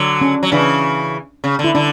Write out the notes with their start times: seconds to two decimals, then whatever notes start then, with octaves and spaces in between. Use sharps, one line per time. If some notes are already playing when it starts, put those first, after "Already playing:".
Already playing: D3 F#3
0.21 C#4
0.43 F#3
0.52 C#3 E3 D4
1.44 C#3
1.59 D3
1.64 E4
1.75 D3 D4